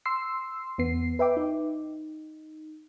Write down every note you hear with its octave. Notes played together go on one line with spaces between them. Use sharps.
C6 E6 C7
E2 B3 C7
B4 E5 G5 D6
D#4